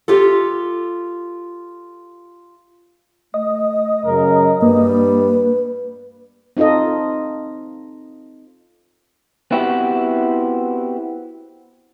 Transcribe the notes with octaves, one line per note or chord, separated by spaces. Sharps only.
F4 G4 A4
A3 D#5
F#2 C#3 A#4
G2 G3 A#3 B4
C4 D#4 F4 A4 D#5
B3 C4 E4 F#4 G4